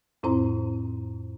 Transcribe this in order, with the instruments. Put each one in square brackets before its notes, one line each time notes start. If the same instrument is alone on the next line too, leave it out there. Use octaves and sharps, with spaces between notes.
[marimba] F2 A2 C4 E4 C5 A#5